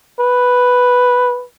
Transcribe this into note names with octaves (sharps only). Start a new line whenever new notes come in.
B4